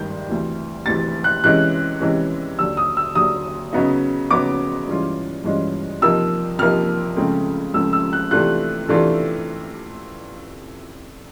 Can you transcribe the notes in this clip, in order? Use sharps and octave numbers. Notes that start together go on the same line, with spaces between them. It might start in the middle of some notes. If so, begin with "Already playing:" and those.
Already playing: G2 D#3 G#3 G6
D2 C3 E3
D2 C3 E3 A6
F#6
C3 E3 G#3 C#4 F#6
C3 E3 G#3 C#4
D#2 D3 F#3 E6
D#6
E6
D#2 D3 F#3 D#6
C#3 F#3 B3 D#4
C#3 F#3 B3 D#4 D6
G2 E3 G#3 C#4 F4
G2 E3 G#3 C#4 F4
C3 F3 A#3 D#4 E6
C3 F3 A#3 D#4 F6
C#2 C#3 F3 A3 C4
C#2 C#3 F3 A3 C4 E6
E6
F#6
C3 E3 A3 D4 F4 F#6
C3 E3 A3 D4 F4